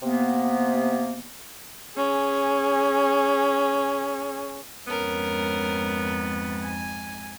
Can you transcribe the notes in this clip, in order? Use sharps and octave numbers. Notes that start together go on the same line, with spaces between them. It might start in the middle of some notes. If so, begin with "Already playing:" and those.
C3 A#3 B3
C#4 G#4
F2 G#2 B3 C#4 A#4
G#5